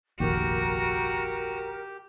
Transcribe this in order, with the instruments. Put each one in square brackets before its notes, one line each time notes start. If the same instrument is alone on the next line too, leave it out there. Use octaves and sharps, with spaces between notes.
[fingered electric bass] F1 A#1 D#2 [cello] F#4 [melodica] G4 [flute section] A#4